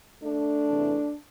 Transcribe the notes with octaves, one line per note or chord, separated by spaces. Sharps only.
A3 D4
E2 C3 E3